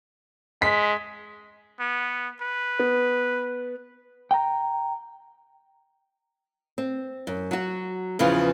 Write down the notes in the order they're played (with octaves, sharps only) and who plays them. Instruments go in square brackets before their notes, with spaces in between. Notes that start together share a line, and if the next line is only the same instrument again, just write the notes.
[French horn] G#3 [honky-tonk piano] B6
[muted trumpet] B3
B4
[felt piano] B3
[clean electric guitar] G5 A#5
[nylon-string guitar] C4
F#2
F#3 F#4
E2 C#3 E3 F3